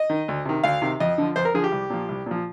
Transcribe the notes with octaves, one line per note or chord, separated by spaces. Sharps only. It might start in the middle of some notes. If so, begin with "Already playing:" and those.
Already playing: D#5
D#3
D2
C3 D#3
D2 F5
C3 D#3
F2 D#5
D3 F3
F2 C5
A#4
D3 F3 G#4
G4
C2
A#2 F3
C2
A#2 F3